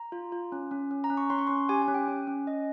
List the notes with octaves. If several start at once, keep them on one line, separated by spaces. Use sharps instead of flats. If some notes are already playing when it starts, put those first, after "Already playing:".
Already playing: A#5
F4
F4
C#4
C#4
C#4
A#5
C#4
C#6
C#4 C6
C#6
C#4 C6
G4 G#5
G#5
C#4
G5
C#4
C#4
C#4 D#5